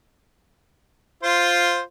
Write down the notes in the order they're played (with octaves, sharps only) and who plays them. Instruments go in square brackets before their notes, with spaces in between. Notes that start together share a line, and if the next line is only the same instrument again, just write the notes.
[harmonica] F4 C5